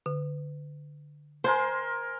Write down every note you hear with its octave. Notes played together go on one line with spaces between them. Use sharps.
D3
A#4 C5 G#5 C6